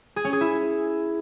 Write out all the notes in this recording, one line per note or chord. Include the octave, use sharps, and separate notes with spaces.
G#4
C#4
G#4
E4